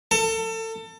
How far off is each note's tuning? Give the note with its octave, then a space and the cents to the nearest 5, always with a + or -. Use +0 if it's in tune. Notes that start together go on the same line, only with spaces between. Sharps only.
A4 +30